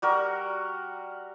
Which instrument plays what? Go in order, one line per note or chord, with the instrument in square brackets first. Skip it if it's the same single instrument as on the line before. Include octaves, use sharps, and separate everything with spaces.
[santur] G3 F#4 A#4